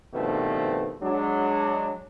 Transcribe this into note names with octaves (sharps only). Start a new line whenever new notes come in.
G2 B2 D#3 F3 A3 C4
F#3 G#3 D4